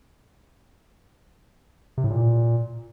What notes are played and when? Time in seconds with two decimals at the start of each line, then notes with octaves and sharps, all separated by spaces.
1.98 C3
2.04 A2
2.10 A#2